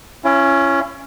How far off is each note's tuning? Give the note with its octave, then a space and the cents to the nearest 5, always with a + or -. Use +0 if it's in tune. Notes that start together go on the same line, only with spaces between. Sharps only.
C#4 -5 E4 +40